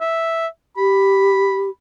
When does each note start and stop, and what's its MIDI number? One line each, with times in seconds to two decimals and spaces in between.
0.01 0.47 76
0.77 1.70 67
0.77 1.70 83